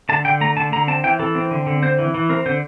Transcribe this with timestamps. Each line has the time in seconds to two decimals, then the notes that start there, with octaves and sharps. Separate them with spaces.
0.09 D3 A5
0.25 D3 G5
0.41 A3 A#5
0.57 D3 A5
0.73 D3 A#5
0.88 C4 A5
1.04 E3 G5
1.19 E3 A4
1.35 C4
1.51 D3
1.67 D3
1.82 C4 C5
1.99 E3
2.14 E3
2.29 C4 A#4
2.46 D3 C5